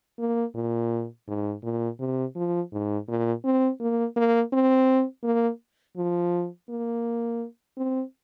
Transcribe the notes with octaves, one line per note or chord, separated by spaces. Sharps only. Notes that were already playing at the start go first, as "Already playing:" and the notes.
A#3
A#2
G#2
A#2
C3
F3
G#2
A#2
C4
A#3
A#3
C4
A#3
F3
A#3
C4